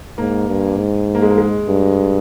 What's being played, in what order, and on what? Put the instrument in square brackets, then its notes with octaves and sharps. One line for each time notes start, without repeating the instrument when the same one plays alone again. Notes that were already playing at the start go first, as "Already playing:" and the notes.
[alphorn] G#2 [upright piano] A#3
[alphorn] G2
G#2
[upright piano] A#3
G#3
A#3
G#3
[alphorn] G2